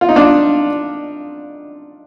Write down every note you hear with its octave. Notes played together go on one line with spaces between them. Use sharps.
F4
D#4
D4 F4